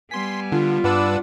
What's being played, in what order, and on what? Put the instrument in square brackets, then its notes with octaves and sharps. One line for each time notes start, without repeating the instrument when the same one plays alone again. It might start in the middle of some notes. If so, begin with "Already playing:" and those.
[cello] G3 B3 [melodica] G#5 [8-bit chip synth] C6 B6
[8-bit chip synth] D3 [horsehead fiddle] F4
[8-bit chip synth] G2 B4 E6 [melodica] D4 D5 F#5